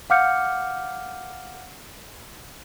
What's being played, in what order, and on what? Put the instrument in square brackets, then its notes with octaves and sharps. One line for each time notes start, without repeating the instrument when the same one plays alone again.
[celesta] F5 F#5 D6 F6 G6 C#7